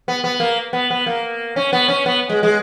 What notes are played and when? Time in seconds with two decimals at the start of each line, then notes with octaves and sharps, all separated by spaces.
0.08 B3
0.24 B3
0.40 A#3
0.73 B3
0.90 B3
1.06 A#3
1.56 C#4
1.73 B3
1.88 C#4
2.06 B3
2.29 G#3
2.43 G#3